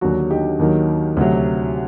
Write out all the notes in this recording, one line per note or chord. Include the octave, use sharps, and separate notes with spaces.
D#2 D3 F#3 D4 F#4
D#4 G4
D#2 D#3 F#3
D2 C3 F#3